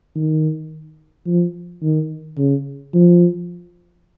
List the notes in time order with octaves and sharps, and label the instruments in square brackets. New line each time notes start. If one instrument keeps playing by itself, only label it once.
[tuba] D#3
F3
D#3
C#3
F3